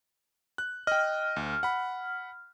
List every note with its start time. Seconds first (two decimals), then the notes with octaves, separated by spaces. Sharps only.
0.58 F#6
0.87 D#5 G5 F6
1.36 D2
1.63 F#5 B5